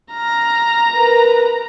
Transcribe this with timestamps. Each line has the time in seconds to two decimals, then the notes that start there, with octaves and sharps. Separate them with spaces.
0.13 A#5 F6
0.91 A#4 B4